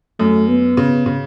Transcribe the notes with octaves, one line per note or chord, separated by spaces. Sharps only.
F#2 A3
B3
C#3
C#3